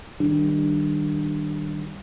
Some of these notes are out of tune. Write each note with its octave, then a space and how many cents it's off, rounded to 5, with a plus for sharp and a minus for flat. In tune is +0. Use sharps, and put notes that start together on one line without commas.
D#3 +0 G3 +0 D4 +15